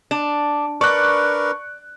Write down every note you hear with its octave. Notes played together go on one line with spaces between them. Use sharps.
D4
D4 A#4 B4 D5 C#6 F#6